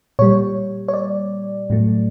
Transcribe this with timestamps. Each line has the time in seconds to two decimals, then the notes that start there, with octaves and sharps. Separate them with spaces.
0.19 A#2 G3 C#5
0.88 C#5
0.94 D5
1.70 A2 F#3 A3